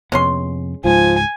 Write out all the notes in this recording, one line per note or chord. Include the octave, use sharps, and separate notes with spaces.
F2 C3 G#3 B3 C#4 C6
C#2 G#2 F3 G#5